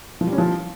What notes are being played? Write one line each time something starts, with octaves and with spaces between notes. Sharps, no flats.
F3
G3
C#4
F3